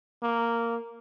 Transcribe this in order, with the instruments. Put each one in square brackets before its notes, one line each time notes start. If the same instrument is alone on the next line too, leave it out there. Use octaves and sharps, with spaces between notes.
[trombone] A#3